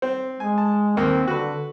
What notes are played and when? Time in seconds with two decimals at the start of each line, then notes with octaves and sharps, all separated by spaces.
0.02 C4
0.40 G#3 G#5
0.58 A5
0.97 D#2 A#3 C4
1.28 D3 F#4 B4